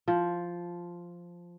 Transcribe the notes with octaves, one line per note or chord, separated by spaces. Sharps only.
F3